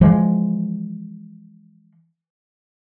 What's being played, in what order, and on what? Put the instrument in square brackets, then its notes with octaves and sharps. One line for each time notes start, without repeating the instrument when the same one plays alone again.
[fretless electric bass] E3 F3 G#3